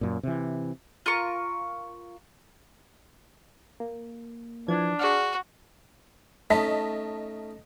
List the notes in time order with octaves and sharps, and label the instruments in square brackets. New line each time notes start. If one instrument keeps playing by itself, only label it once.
[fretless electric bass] F#2 A#2
C3 E3
[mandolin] F4 A#4 C#6
[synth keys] A#3
[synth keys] E3 F3 G#6 [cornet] D4
[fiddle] F#4 [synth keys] G#4 D5 F6
[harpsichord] A3 C#4 D#4 [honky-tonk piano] D#5 A5 B6